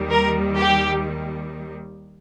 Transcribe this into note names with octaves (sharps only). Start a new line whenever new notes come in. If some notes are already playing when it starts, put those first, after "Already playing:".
Already playing: D#2 D#3 G3
A#4
G4